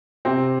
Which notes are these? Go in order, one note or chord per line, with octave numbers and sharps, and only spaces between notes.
C3 C4